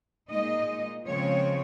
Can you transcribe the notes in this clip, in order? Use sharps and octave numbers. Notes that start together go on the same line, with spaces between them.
A#2 G#3 D#4 D#5
C#3 F3 G#3 C4 C#5